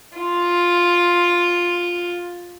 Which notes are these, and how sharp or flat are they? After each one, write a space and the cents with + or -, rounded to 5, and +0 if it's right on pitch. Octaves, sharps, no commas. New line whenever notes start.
F4 +5